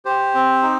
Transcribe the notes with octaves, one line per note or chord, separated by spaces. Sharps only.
G4 C5
C4
D#4